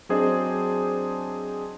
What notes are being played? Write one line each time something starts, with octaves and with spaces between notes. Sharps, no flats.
F#3 C4 D4 G#4 C5 D#5